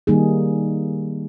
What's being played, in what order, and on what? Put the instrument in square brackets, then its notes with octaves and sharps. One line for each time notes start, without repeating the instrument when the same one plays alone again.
[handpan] D#3 G3 A#3 D#4 G#4